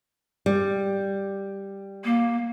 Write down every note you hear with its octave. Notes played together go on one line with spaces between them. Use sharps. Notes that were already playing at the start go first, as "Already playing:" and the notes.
G3
A#3